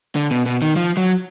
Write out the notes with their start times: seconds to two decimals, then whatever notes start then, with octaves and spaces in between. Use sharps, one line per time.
0.16 D3
0.31 B2
0.46 B2
0.62 D#3
0.76 F3
0.97 F#3